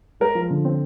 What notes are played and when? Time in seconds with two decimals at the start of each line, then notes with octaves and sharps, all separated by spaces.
0.20 G#3 A#4
0.35 F3
0.51 D3
0.65 C4